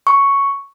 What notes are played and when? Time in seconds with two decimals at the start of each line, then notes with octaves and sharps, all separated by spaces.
0.07 C#6